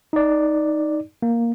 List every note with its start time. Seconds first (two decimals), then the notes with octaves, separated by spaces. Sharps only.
0.13 D#4 D5
1.22 A#3